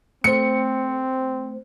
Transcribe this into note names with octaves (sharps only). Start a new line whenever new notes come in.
A3 C4 C5 C#7